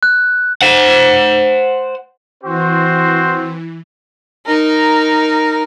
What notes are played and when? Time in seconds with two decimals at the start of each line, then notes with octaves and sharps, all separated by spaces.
0.03 F#6
0.62 C5 F#5
2.43 E3 C4 F#4 C5
4.47 D#4 A#4